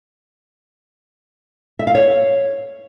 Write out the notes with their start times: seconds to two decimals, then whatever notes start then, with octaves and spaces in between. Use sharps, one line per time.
1.79 E5
1.87 F5
1.95 C#5